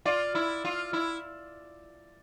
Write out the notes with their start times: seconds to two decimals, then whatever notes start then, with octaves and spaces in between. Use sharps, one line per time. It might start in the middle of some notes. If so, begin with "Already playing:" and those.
0.05 F4 D5
0.35 E4
0.65 F4
0.93 E4